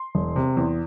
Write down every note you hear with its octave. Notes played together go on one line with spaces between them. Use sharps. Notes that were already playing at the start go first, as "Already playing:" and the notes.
Already playing: C6
E1
C3
E2